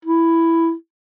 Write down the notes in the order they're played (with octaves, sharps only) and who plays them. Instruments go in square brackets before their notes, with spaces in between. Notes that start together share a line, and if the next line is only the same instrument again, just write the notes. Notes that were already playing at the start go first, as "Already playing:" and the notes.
[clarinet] E4